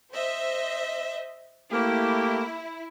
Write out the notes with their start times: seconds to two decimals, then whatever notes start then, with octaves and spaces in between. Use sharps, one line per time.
0.11 C5 D#5 E5
1.72 A3 A#3 E4 G4